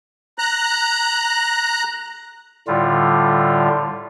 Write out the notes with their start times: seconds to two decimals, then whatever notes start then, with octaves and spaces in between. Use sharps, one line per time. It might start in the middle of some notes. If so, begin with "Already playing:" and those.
0.38 A#5 F#6
2.67 A2 D3 G3 F4